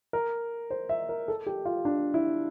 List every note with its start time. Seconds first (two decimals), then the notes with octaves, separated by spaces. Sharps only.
0.13 A#4
0.70 C5
0.89 E5
1.09 A#4
1.28 A4
1.47 G4
1.65 F4
1.85 D4
2.14 E4